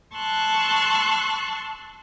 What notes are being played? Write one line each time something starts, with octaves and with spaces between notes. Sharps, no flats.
A5 C6 C#6 E6 F#6